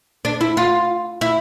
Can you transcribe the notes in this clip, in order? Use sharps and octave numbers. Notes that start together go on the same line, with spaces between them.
D4
E4
F4
E4